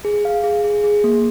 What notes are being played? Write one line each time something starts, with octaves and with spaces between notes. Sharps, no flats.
G#4
F5
G#4
G#4
G#4
A#3